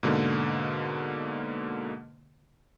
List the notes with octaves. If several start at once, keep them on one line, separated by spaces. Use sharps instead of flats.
G#2 B2 D3 A#3